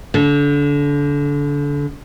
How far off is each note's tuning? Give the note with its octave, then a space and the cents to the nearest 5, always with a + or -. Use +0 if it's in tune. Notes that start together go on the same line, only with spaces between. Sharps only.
D3 -30